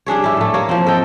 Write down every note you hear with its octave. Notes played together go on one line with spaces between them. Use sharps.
G3 D4 G#4 C#5
E4 G4
A2 A3
A#3 C#5
F3 C4
A4 D#5 G5